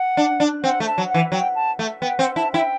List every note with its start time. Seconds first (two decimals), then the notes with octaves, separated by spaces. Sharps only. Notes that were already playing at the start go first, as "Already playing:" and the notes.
Already playing: F#5
0.17 D4
0.40 D4
0.63 C4 F#5
0.80 A3
0.86 A5
0.98 F#3
1.09 F#5
1.14 E3
1.32 F#3 G5
1.55 A5
1.79 A3
2.01 B3 G5
2.19 C4 F#5
2.36 E4 A5
2.53 E4 G5